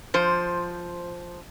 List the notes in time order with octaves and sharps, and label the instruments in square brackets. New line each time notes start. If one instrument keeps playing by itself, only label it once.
[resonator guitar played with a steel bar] F3 C5